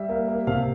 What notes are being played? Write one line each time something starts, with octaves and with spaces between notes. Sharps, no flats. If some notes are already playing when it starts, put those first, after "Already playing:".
Already playing: G3 E5
A#3
A#3
C3 F5